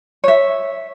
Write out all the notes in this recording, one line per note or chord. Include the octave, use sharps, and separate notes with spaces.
C#5 E5